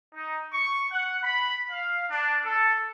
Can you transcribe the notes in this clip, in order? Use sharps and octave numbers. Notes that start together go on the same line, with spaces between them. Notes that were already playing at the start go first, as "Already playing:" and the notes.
D#4
C#6
F#5
B5
F5
D4
A4